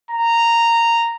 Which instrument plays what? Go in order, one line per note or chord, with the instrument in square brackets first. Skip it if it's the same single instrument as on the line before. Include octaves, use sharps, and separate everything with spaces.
[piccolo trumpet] A#5